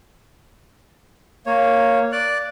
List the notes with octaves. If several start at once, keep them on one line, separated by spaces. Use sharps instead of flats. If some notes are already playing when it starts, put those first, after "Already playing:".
A#3 C#5
D5 F#6